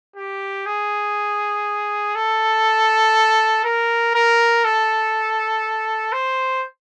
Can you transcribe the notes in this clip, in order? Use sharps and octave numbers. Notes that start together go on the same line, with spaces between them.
G4
G#4
A4
A#4
A#4
A4
C5